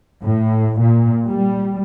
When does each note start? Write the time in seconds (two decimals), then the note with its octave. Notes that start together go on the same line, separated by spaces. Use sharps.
0.23 A2
0.81 A#2
1.28 G3